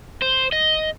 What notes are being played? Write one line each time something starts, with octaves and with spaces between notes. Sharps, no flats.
C5
D#5